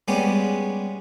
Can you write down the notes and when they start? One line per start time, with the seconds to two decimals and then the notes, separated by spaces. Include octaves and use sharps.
0.08 G3 G#3 B3 C#4 G4